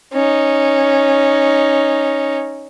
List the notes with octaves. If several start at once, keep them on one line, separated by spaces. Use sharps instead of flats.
C#4 D#4